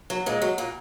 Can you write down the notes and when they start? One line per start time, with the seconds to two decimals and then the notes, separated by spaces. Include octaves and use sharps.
0.10 F#3
0.26 A#2 G#3
0.42 F#3
0.58 A#2